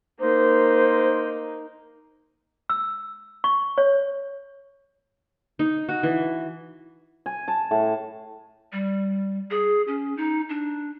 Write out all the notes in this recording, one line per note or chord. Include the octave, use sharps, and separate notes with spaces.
A#3 D#4 C5
E6
C#6
C#5
D#4
F#4
E3
G#5
A5
A2
G3
G#4
C#4
D#4
D4